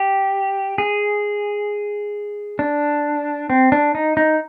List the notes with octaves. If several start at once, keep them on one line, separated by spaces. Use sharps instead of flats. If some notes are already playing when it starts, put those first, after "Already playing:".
Already playing: G4
G#4
D4
C4
D4
D#4
D#4